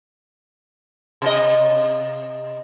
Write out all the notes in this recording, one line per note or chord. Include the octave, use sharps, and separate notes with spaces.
C3 D#5